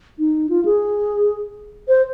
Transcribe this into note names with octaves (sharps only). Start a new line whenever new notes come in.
D#4
F4
G#4
C5